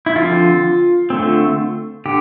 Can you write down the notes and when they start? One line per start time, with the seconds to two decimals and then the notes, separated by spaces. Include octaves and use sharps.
0.06 E4
0.16 D3 F3 C4 F4
1.10 D3 A3 C4
2.06 D3 G4